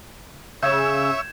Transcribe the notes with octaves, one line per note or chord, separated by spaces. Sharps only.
C#3 C#5 E5 E6 G6 G#6 E7